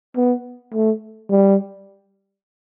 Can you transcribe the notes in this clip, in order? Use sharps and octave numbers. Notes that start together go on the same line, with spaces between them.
B3
A3
G3